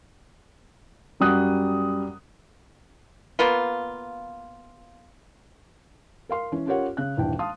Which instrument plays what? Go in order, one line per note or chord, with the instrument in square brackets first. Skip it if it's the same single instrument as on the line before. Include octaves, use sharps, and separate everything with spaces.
[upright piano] F#2 G3 F#4 D#6 F#6
[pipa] A#3 B3 F4
[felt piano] A#4 F5 C6
E3 C#4
C#4 F4 G4 A#4 C#5 F#5
C#3 F#6
D#1 E3 D4 G5
F5 A5 C6 D#6